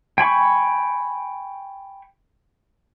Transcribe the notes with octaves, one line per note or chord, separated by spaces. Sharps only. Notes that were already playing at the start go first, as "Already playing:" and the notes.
G5 G#5 B5 C#6